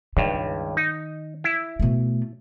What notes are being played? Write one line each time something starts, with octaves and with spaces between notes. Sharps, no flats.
C#2 G2 D#3
D#4
E4
B2 A3